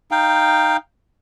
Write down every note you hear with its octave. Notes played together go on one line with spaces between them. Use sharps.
D#4 F5 G5